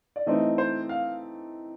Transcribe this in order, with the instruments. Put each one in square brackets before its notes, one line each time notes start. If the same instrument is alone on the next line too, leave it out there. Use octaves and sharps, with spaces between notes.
[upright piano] D5
[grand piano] E3 A3 C4 D#4 [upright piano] D#5
[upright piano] C5
F5